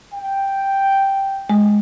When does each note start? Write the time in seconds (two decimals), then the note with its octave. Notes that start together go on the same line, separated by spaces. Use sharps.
0.13 G5
1.50 G#3